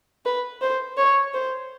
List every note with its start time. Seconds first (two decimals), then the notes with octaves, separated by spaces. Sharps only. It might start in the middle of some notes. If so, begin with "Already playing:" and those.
0.25 B4
0.62 C5
0.97 C#5
1.34 C5